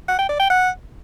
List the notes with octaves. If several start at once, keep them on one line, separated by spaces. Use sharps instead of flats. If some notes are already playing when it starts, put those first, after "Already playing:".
F#5
G5
D5
G5
F#5